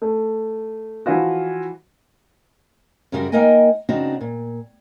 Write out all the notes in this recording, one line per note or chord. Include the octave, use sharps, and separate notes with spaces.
A3
E3 F3 F4 F#4
F#2 C#3 G3 F#4 A#4
A#3 D#4 A#4 D#5 G5 G#5
C#3 C4 D4 D#4 F#4
A#2